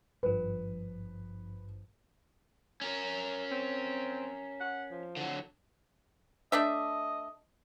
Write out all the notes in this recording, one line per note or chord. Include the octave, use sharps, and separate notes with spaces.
G#1 G2 F3 B4
C#4 A#4
C4
F#5
F3
D3 F#3
A3 D4 D#5 E5